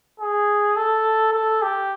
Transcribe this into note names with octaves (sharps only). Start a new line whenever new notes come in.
G#4
A4
A4
G4